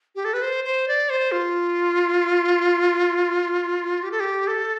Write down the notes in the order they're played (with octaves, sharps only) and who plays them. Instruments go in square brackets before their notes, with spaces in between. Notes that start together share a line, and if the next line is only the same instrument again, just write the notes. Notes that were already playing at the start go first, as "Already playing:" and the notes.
[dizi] G4
A4
B4
C5
C5
D5
C5
F4
G4
A4
G4
A4